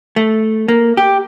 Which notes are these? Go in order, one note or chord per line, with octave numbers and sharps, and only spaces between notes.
A3
A#3
G4